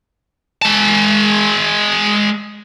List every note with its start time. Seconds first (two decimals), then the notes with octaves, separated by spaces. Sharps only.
0.62 G#3 A5